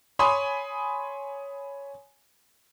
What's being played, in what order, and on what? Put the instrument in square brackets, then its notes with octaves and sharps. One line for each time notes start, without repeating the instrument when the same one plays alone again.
[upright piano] C#5 G#5 B5 C6 D#6